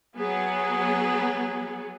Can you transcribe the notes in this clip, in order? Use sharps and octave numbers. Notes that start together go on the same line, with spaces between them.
F#3 B3 G#4